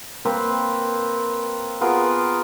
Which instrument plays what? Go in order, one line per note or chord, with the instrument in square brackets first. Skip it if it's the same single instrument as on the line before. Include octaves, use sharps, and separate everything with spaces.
[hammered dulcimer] A#3 C4 B4
B3 F4 G#4 A#4